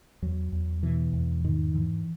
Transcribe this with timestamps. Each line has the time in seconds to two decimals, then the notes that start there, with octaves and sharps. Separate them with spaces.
0.22 E2 F#3
0.52 E2
0.83 B2 E3
1.13 E2
1.44 G#2 D#3
1.74 G#2 E3